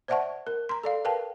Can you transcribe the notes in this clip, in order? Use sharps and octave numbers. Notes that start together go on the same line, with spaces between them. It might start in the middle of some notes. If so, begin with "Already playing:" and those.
C5 D5 E5 F#5 A5 C#6
A#4
A#5 C6
A4 D5 F5
A#4 B4 F5 G5 A5